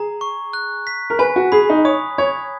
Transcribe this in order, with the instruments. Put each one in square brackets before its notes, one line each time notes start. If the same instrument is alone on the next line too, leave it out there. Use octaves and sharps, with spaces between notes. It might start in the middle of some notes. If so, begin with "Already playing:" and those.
Already playing: [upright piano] G#4 [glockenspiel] A#5
[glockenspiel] C#6
F#6
B6
[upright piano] A#4
[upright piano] B4 [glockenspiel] G#5
[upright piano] F#4
[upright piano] G#4 [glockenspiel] B5
[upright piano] D#4
[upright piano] C#5 [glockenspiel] D#6
[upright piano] C#5 [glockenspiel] G#6